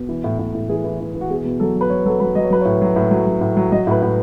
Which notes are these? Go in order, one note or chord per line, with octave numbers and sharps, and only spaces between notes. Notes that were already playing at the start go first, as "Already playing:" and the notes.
Already playing: B2
E3
A2
A2
A2
E3 G#4
E3
E3
E3
F#4
B2 G#4
B2
F#3 A4
F#3
B4
F#3 C#5
F#3 A4
F#3 B4
F#3 D#5
C#5
F#3 B4
A2 C#5
F#3
A2
F#3
F#3
A2
F#3
F#3 D#5
A2 B4
A2